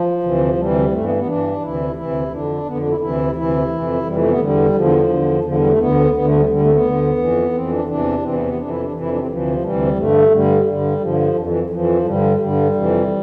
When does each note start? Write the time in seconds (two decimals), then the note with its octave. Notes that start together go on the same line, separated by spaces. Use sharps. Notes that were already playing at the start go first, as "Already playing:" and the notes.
Already playing: F3
0.23 D2 C3 E3
0.57 D2 C3 E3 G3
0.92 G2 E3 A3
1.04 B3
1.15 B3
1.26 G2 E3 D4
1.61 D2 C3 E3 E4
1.96 D2 C3 E3 E4
2.31 F2 D3 D4
2.65 F2 D3 B3
2.77 D4
2.89 E4
3.00 D2 C3 E3 E4
3.35 D2 C3 E3 E4
3.70 F2 C3 E3
4.04 F2 C3 E3 G3
4.16 A3
4.28 B3
4.40 E2 D3 G3
4.74 E2 D3 F3
5.09 E2 D3
5.44 E2 D3 F3
5.56 G3
5.67 A3
5.78 D2 D3 B3
6.14 D2 D3 B3
6.25 A3
6.37 G3
6.49 D2 D3 G3
6.60 A3
6.67 C4
6.71 B3
6.83 D2 D3
7.18 F2 E3
7.52 F2 E3 C4
7.70 D4
7.87 E2 C3 E3 D4
8.22 E2 C3 E3 C4
8.34 B3
8.45 B3
8.57 F2 C3 E3 D4
8.69 E4
8.80 D4
8.92 F2 C3 E3
9.01 E4
9.10 D4
9.18 C4
9.27 D2 C3 E3 F3
9.62 D2 C3 E3 G3
9.96 G2 D3 A3
10.31 G2 D3 G3
10.66 G2 D3 G3
11.00 G2 D3 F3
11.35 F2 E3
11.47 E3
11.59 F3
11.70 F2 E3 F3
12.05 G2 D3 G3
12.40 G2 D3 G3
12.74 F2 C3 E3